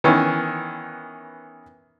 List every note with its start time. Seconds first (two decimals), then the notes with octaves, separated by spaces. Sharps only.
0.04 D#3 E3 B3 C#4